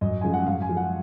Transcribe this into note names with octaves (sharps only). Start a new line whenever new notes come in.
F#2 D#5
C#3 F3 G#3 G#5
F#5
F#2 F5
G#5
F3 G#3
F#5